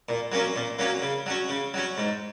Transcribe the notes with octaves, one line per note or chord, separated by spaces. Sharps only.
A#2
F#3 A#3 C#4
A#2
F#3 A#3 C#4
C#3
F#3 C#4
C#3
F#3 C#4
G#2